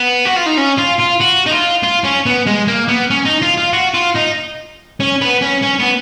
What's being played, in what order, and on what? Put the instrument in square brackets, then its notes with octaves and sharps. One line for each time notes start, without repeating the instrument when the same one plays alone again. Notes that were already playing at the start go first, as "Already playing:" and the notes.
Already playing: [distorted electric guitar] B3
F#4
F4
D#4
C#4
F4
F4
F#4
D#4
F4
F4
C#4
B3
G#3
A#3
B3
C#4
D#4
F4
F4
F#4
F4
D#4
C#4
B3
C#4
C#4
B3